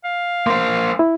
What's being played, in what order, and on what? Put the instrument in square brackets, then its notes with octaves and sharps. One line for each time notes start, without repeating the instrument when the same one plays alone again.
[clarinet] F5
[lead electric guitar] A#3 C5 [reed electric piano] C6
[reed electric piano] E4